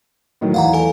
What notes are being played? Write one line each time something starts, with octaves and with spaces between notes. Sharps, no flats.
A2 D#3 F#3
E2 E3 F5 F#5 A#5
A4 G#5